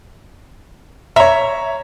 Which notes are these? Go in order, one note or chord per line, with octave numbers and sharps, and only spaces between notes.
C#5 E5 A#5